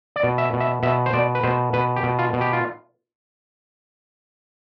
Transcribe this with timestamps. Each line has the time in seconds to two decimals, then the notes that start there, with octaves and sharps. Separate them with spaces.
0.16 D5
0.23 B2
0.38 E5
0.53 B2
0.60 E5
0.83 B2 E5
1.06 C5
1.13 B2 D5
1.35 B4
1.43 B2 C5
1.73 B2 B4
1.96 G4
2.03 B2
2.19 F4
2.33 B2
2.41 G4
2.53 F4